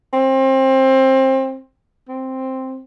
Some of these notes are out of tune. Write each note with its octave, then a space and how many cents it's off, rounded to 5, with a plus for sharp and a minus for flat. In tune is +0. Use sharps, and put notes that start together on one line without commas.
C4 +25
C4 +5